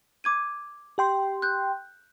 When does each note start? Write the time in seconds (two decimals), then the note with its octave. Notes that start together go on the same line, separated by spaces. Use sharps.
0.24 D6 G#6 D#7
0.98 G4 G5 C6
1.42 F#6 G6